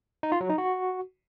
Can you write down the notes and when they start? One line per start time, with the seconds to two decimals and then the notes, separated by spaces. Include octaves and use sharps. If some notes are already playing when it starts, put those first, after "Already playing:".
0.23 D#4
0.32 F4
0.41 F#3
0.49 D#4
0.58 F#4